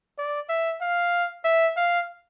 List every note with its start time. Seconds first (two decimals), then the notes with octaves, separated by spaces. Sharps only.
0.18 D5
0.49 E5
0.81 F5
1.45 E5
1.77 F5